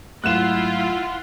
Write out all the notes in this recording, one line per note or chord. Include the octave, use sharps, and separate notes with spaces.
G#2 F#3 A3 E4 F4 F#5 F#6 E7